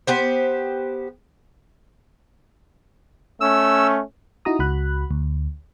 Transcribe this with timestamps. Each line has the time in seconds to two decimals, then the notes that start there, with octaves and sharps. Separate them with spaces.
0.07 B3 G4 C5
3.41 A3 C#4 E6
4.45 D#4 E4 F#4 A#5 D#6
4.59 C#2 F#4 B5 F#6
5.11 D2